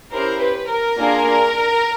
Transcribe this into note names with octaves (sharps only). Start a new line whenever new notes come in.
C#4 E4 G4 A#4 C5
B4
A#4
A#3 D4 F4 G#4